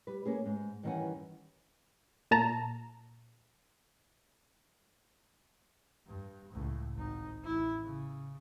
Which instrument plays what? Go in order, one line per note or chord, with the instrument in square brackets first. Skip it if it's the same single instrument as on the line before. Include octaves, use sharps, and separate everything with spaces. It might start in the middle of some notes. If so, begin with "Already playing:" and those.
[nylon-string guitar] G3 B4
A#3 C#4 G#4
G#2
G2 D#3 E3 C#4 F#5 G#5
[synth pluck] A#2 A5 A#5
[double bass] G2
C#2 A2
G#1 D#4
A1 E4
C#3